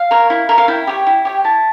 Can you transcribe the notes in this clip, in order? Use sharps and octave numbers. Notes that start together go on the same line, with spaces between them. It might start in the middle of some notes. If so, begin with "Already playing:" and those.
Already playing: F5
A#4 C#5
E4
A#4 C#5
F5
E4 G5
G4 C#5
E4
G4 C#5
E4 A5